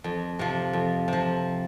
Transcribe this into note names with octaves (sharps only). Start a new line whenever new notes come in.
F2
C3 F3
F2
C3 F3